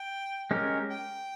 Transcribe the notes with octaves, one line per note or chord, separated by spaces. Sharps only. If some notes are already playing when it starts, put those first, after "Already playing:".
Already playing: G5
G#3 C#4 G4 A#4
G5